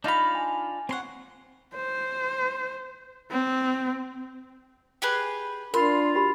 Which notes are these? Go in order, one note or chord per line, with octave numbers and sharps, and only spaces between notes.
D4 D#4 F4 F5 B5 A#6
G#5
C4 C#5 F#5 C6
C5
C4
G4 G#4 B4
D4 F4 A#4 B5 C6
F#4 G4 B5